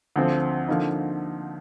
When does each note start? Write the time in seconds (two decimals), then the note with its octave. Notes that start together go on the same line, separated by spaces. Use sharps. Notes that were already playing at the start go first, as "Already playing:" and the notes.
0.16 D2 D3 F3 C4
0.68 D3 F3 A#3 D#4